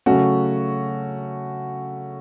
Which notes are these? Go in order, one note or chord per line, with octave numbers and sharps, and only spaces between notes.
C#3 F#3 A3 C#4 F#4